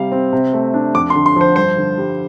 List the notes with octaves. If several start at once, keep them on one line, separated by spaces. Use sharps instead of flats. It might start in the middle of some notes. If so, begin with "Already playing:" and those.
Already playing: C3 G3 F5
C4
C3
A3
D4
F2 D6
C6
D3
C6
F3 C5
G2 C5
D3
G3